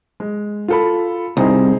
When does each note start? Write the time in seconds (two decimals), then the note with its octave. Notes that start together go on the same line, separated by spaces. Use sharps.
0.20 G#3
0.68 F4 A4 B5
1.37 C2 C4 D#4 G#4